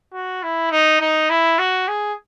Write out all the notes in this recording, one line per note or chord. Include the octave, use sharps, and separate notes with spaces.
F#4
E4
D#4
D#4
E4
F#4
G#4